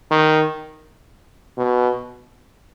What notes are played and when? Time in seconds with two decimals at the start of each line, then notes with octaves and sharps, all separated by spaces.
0.11 D#3
1.57 B2